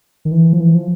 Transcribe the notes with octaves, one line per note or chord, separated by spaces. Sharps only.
D#3
E3
F3
E3
F3